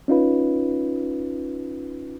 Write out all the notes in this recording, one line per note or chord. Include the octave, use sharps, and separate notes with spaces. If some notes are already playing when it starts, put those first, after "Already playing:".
C#4 D#4 F4 B4